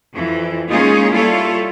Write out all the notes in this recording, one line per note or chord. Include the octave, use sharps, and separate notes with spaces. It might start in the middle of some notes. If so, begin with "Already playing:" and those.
F2 E3
G#3 A#3 C#4 D#4 F4 G#4
G3 E4 F4 A4 C#5